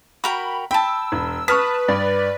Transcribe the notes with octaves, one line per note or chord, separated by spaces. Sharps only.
F#4 A#4 G5 B5
G5 A5 B5 E6
E1
B4 A5 C#6 D#6 F6 B6
G2 D5